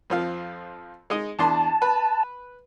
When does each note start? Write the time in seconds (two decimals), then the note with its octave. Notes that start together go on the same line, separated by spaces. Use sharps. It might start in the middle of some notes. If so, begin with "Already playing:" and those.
0.10 F2 F3 F5
1.10 G#3 D#4 D#5
1.39 E2 D4 A5 C6
1.82 B4